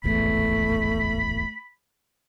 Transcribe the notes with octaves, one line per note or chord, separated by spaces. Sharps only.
D1 G#1 E2 A3 B5